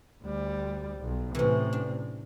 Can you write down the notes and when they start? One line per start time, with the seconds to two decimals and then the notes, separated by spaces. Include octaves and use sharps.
0.21 D2 G3
1.00 B1
1.35 A2 C3 E3 C#4
1.73 D4